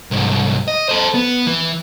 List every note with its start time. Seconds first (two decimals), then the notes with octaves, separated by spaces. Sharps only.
0.11 C2 G#2
0.68 D#5
0.89 A4 C5
1.15 B3
1.47 E3